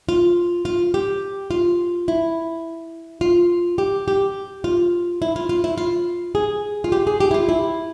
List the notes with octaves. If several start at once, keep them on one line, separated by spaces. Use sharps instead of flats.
F4
F4
G4
F4
E4
F4
G4
G4
F4
E4
F4
F4
E4
F4
G#4
F4
G4
G#4
G4
E4
F4
E4